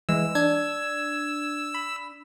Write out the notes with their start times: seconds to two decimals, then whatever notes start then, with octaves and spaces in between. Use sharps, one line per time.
0.09 E3 G#3 E6
0.35 D4 G#6
1.74 B5